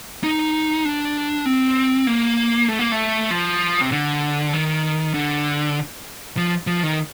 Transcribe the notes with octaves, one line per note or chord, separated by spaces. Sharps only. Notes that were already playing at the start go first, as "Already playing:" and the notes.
D#4
D4
C4
A#3
A3
A#3
A3
F3
C3
D3
D#3
D3
F3
F3
D#3